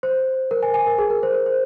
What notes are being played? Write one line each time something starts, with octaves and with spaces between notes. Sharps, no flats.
C5
A#4
G#5
G#5
A#4
G#4
A#4
C5
A#4
C5